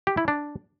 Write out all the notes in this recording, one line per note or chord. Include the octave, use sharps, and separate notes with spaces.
G4
E4
D4